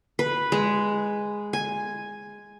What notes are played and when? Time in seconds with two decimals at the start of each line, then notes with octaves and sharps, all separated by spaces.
0.19 B4
0.52 G#3
1.53 G#5